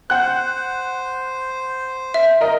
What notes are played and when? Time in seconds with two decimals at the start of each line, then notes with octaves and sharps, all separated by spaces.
0.10 C5 F#5 F#6
2.14 E5
2.41 A#4 D#5